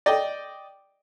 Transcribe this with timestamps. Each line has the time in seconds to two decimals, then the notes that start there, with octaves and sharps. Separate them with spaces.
0.06 D5 D#5 G5